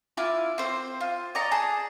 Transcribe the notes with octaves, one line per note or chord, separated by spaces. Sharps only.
E4 F4 D6 F6
C4 C5
F4
D5 D#5 A#5 C#6
G#4 A5